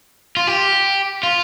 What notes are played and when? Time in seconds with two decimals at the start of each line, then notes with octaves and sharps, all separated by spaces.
0.37 F4
0.47 G4
1.23 F4